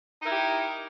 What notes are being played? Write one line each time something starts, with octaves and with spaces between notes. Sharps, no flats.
D#4 E4 G4 A#4